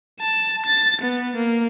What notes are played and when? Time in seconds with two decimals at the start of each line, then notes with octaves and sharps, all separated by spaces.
0.20 A5
0.65 A6
1.01 B3
1.36 A#3